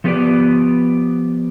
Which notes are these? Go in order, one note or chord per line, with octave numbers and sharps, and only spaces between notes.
F3 A3 B3 G4 B4 D5